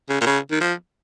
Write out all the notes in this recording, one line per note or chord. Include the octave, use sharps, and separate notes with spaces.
C#3
A#2
C#3
D#3
F3